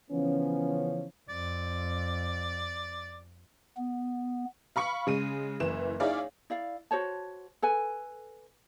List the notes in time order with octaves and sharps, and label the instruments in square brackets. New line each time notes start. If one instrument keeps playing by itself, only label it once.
[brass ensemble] C#3 E3 F3 B3 C#4
[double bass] F2 [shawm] D5
[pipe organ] B3
[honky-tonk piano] F5 B5 C#6 C#7
C#3 G#3 D#7
F#1 E3 E7
D#4 E4 G#4 C#5 D5 F5
[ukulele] E4 D5 F5
F#4 C5 C#5 A5
A4 B4 G#5